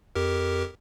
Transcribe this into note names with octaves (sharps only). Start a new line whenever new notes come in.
F2 G4 A#4